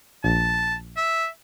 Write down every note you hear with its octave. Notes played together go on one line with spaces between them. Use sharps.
A#1 A5
E5